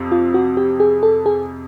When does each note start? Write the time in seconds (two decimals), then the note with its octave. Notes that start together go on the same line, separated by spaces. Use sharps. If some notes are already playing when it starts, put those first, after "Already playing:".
Already playing: F2 C3
0.12 F4
0.34 F#4
0.57 G4
0.80 G#4
1.03 A4
1.26 G#4